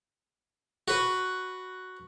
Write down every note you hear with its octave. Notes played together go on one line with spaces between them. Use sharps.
F#4 B4